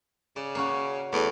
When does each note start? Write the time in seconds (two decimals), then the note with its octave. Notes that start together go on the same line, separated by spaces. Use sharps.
0.36 C#3 D5
0.55 A#3 C#4 F#4
1.13 E2 A3